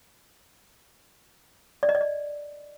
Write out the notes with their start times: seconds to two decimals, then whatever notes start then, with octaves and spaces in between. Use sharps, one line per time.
1.83 D5
1.89 D#5
1.95 D5
2.01 D#5